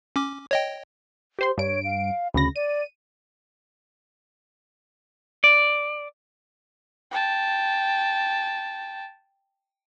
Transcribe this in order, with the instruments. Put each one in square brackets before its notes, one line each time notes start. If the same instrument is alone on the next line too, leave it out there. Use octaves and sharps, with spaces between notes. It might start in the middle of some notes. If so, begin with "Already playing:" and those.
[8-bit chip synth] C#4 D6
C#5 D#5 G5
[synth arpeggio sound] G4 C5 C6
[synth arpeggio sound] G2 D7 [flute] C#5
[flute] F5
[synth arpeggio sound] D2 C#3 A#6 [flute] B5
[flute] D5 [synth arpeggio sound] D#7
[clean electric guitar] D5
[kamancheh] G5 A5